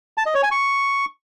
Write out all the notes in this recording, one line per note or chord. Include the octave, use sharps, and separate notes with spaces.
A5
D#5
C#5
G#5
C#6